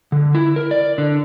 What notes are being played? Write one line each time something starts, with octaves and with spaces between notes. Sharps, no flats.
D3
E4
A#4
D5
D3